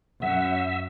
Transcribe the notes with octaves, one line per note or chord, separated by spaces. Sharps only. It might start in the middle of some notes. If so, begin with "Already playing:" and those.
F#2 E5 F#5